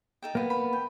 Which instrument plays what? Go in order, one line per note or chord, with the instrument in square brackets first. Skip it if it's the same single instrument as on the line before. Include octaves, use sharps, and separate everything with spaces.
[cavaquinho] D#4 A4 G5
[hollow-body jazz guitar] A#3 B3
[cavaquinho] B5
G5